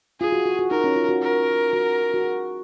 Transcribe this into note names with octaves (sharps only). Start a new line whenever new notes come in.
F4 G#4
F#4
F#4
F#4
D#4 A#4
C#4
F4
F#4
A#4
F#4
F#4
G#4